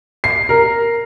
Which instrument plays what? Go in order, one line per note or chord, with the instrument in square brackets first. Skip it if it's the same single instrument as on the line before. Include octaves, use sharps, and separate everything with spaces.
[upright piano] C7
A#4